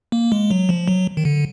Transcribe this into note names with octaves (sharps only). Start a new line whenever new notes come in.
A#3
G#3
F#3
F3
F#3
D#3
D3